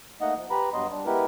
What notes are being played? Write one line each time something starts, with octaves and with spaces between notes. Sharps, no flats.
A3 A#3 D#4 D#5 F#5
F3
G4 B4 A#5 B5
G2 F#3 B3 D#5 C6
G3 D4
G#3 B3 E4 G4 A#4 B4